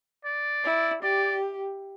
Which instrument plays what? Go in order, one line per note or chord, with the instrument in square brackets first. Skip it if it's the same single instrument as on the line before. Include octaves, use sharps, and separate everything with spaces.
[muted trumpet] D5
[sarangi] E4
[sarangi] G4 [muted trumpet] D5